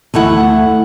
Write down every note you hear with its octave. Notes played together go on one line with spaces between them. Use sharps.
D2 A3 E4 F#5